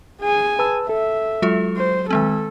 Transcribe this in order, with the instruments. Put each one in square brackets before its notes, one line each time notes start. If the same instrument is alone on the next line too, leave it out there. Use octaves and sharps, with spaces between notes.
[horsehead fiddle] G#4 G#5
[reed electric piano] B4 A5 E6
[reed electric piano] A4 [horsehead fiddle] E5
[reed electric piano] F#3 [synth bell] G#3 F4 A4
[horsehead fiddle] C5
[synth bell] D#3 G#3 C4 [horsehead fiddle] A4